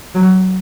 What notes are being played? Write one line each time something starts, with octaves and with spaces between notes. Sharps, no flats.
F#3